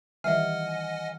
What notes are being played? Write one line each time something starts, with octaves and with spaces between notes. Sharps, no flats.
D#3 E3 G3 D#5 E5 F#5 G#5 F6